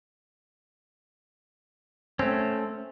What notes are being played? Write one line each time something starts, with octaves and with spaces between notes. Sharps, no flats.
A3 C4 C#4